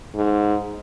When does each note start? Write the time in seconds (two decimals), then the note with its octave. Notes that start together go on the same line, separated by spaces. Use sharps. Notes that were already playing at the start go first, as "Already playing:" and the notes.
0.16 G#2